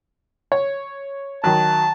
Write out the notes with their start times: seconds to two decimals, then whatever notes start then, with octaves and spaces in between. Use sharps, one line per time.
0.52 C#5
1.44 D#3 F#3 A5